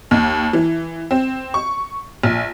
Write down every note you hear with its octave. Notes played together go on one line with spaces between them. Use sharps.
D#2
E3
C4
C#6
A#1